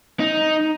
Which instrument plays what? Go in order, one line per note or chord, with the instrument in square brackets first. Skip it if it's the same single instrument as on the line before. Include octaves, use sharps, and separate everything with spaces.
[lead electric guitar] D#4